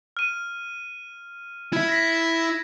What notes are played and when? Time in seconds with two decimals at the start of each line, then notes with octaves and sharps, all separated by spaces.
0.17 F6 D#7
1.73 E4 E5 G#6
1.89 A#6 B6